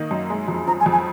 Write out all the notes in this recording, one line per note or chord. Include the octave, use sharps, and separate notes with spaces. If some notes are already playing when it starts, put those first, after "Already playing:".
Already playing: D#3 A#3 D#4
F#2
G#3
F2
F3 A#5
G#5
F2
G#5